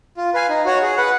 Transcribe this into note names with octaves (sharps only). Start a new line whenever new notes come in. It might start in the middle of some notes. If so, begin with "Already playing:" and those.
F4
B4 F5 G#5
D#4
F#4 C#5 F#5
G#4
B4 F#5